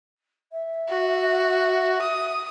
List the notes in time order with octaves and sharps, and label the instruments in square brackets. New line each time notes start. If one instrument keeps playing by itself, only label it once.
[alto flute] E5
[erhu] F#4
D#6